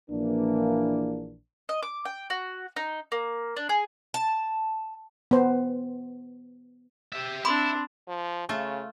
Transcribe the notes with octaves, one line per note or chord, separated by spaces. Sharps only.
A#1 E3 A#3 D4
D#5
D6
G5
F#4
D#4
A#3
D4
G#4
A5
B3 C5
G4 E5
C4 D4 E4 B5 C6 D6
F3
C#3 A3 F4